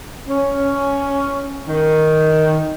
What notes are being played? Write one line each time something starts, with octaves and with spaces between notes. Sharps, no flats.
C#4
D#3